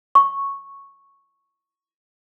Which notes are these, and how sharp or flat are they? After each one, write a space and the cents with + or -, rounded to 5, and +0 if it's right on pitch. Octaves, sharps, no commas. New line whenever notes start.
C#6 -5